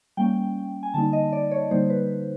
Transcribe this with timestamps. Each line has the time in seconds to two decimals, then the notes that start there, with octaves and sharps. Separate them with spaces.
0.17 G3 A#3 C#4 G5
0.83 G#5
0.94 D3 G3 A#3 D#4 A5
1.13 D#5
1.33 D5
1.51 C#5
1.71 D3 G3 A#3 D#4 C5
1.90 B4